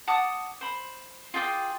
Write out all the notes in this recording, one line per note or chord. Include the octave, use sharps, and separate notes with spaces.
F#5 A5 D6 D#6
C5 B5
F4 G#4 G5 D6